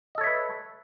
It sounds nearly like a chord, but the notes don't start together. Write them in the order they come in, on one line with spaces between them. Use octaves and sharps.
D#5 A4 C#5 E5 B4